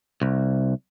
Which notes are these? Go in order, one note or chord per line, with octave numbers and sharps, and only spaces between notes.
C2